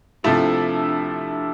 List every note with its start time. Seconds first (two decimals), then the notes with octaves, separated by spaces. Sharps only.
0.23 C3 F3 A3 D4 E4 A4
0.39 D4
0.81 D4